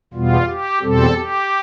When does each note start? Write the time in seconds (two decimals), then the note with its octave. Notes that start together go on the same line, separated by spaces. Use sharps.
0.13 E2 B2 G3 B3 F4
0.48 G4
0.82 E2 B2 G3 C4 A4
1.17 G4